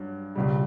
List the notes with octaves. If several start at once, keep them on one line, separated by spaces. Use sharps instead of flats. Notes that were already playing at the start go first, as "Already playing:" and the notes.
Already playing: G2 F#3
C#2 B2 G3